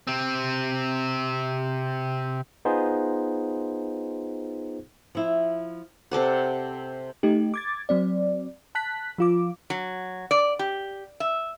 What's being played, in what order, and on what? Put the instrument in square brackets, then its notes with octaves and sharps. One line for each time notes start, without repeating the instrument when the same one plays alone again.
[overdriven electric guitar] C3 C4
[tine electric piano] B3 D#4 F4 G#4 C5
[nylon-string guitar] F3 E4
[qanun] C3 A4 D5 F#5
[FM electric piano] A3 D#4 G4
D6 G#6 A6
F#3 C4 D5
A5 F#6 B6
F3 F4 D6
[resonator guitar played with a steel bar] F#3
D5
G4
E5